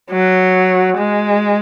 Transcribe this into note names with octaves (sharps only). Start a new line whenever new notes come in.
F#3
G#3